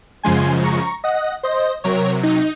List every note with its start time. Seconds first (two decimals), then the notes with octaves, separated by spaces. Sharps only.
0.23 F#2 C#3 F3 G#3 G#5 C6
0.63 A#5 C#6
1.04 D#5 F#5
1.43 C5 D#5
1.84 C3 F#3 A#4 C#5
2.23 D#4